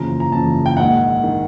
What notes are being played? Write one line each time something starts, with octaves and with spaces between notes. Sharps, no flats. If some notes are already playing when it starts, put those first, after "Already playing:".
Already playing: F#1 E2 C#3 F3 A#5
A#5
F#1 E2 C#3 F3 A5
G5
A#1 G#2 D#3 F#5
D#3